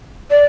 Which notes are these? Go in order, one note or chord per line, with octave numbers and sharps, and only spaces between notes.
D5